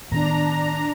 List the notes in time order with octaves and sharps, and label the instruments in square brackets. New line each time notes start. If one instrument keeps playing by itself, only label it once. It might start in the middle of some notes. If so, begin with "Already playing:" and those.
[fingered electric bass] A2 D#3 B3 [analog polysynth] D4 A#5